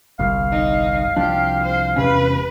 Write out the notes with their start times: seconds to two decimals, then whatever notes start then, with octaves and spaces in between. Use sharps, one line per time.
0.19 G1 C2 F5
0.52 D#4
1.16 C2 F3 D4 G4
1.63 C5
1.96 E1 C3 C#4 B4